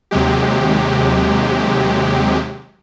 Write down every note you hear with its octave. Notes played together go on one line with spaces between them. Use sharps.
D#2 C3 F#3 G#3 G4